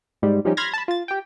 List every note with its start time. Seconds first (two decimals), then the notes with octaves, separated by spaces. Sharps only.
0.22 G#2 G3 G#3
0.45 F3 G3 C#4 D#4 G4
0.57 B5 C6 F6 G#6 A#6
0.73 A5 B5
0.88 F4 A6
1.08 G4 G5